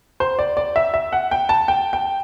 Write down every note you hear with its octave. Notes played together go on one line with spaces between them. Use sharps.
C5
D5
D5
E5
E5
F#5
G5
A5
G5
G5